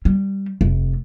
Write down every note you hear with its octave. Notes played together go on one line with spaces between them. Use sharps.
G3
F1